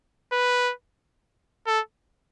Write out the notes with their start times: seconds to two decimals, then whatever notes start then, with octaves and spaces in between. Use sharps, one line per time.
0.33 B4
1.67 A4